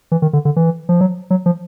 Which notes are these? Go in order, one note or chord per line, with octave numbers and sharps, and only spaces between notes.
E3
D#3
D3
D3
E3
F3
F#3
F#3
F3